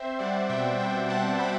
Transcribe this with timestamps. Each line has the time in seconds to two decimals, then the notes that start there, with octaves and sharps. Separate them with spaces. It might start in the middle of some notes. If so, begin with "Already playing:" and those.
Already playing: C4 C5 E5
0.19 G3 D5 F#5
0.49 B2 E5 G5
0.79 B2 E5 G5
1.10 C4 F#5 A5
1.39 G3 G5 B5